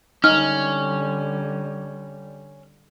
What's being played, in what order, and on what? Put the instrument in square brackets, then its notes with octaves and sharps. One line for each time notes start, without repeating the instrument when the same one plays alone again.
[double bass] D3 G3 [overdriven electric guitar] C#4 [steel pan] D#4 [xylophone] F6